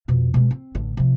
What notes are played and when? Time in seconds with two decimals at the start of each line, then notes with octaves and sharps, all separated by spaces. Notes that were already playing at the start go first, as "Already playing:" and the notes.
0.08 F2 B2
0.34 B2 G#3
0.51 C4
0.75 A1 D3
0.97 C3 F3